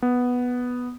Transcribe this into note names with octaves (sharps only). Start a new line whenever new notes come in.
B3